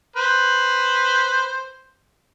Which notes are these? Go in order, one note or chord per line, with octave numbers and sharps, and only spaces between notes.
B4 C5